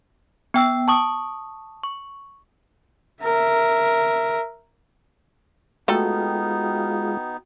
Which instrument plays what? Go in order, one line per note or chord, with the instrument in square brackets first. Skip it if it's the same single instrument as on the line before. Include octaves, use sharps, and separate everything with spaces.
[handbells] B3 G5 E6
A5 C#6 D#6
C#6
[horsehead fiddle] A#4 E5
[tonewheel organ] G#3 F4 [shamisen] A3 A4 [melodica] B3 D#4 [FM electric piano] F#4 G5